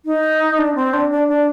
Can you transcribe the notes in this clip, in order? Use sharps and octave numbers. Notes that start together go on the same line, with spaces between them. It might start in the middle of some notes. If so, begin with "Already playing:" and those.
D#4
D4
C4
D4
D4
D4